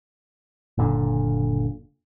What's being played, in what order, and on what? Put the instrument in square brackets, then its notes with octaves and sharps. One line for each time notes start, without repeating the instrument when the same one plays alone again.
[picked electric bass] F#1 A#2 D3